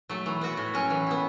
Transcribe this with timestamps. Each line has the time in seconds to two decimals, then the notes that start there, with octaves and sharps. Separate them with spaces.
0.09 F#3 A3
0.26 E3
0.41 B3 F#4
0.57 A2
0.74 F#3 C#4
0.90 E3
1.07 B3 E4